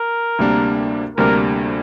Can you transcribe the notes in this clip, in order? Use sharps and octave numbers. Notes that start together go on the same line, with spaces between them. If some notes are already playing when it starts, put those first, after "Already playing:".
Already playing: A#4
D2 C3 G3 A#3 D4
D2 C3 G3 A#3 D4 A#4